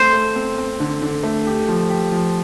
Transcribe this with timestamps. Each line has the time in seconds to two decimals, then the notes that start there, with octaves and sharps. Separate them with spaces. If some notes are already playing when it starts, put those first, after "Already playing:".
Already playing: A3 C4 C5
0.13 A3
0.36 C4
0.58 C4
0.80 D3
1.02 D3
1.23 A3
1.47 G4
1.68 F3
1.90 G4
2.12 F3